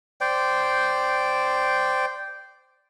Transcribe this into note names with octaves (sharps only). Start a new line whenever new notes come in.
C5 D5 G5